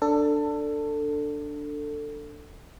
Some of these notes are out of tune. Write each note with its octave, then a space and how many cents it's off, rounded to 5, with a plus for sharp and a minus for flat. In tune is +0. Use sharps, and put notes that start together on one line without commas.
D4 +0 A4 +20